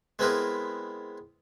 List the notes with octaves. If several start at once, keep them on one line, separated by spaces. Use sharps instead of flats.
G#3 B3 C4 E4 A#4 B4